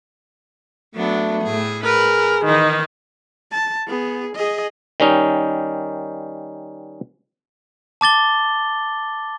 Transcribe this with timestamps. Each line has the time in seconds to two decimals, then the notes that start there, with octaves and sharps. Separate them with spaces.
0.95 F#3 A3 B3 D4
1.43 A2 G#4
1.84 G#4 A#4 B4
2.45 D#3 E3 D#4 B4
3.52 A5
3.87 B3 G#4
4.35 G#4 D#5
5.00 D#3 G3 C#4 D#4
8.01 A5 D6 A6 G7